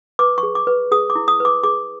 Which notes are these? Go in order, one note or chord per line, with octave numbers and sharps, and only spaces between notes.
B4 D6
C#6
G#4
D6
B4
G#4 D#6
D6
E4
D#6
B4 D6
G#4 D6